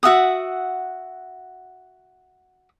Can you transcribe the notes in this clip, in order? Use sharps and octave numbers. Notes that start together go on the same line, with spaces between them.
F#4 E5 F#5 D#6